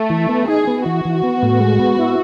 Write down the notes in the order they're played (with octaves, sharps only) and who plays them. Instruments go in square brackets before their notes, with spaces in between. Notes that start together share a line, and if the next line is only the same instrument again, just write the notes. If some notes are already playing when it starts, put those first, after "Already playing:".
Already playing: [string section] A3
[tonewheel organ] E3
B3
[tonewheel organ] D#4 [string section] G#4
[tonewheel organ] B3
[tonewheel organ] E3 [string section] F#4
[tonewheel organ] E3
B3
A2
G#3
B3
E4